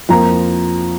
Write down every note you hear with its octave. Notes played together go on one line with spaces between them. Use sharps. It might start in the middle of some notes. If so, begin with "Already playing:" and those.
F2 F3 A#3 A#5